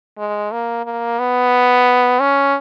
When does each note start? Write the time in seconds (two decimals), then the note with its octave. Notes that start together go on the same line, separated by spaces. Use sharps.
0.18 G#3
0.52 A#3
0.85 A#3
1.19 B3
2.20 C#4